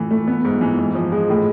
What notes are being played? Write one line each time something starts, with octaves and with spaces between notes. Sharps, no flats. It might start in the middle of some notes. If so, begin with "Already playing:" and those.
Already playing: A2 E3
A3
B3
G#2
E3
G#2
F3
G#3
A2